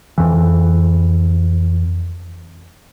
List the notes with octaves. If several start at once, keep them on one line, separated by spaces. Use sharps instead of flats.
F2 E3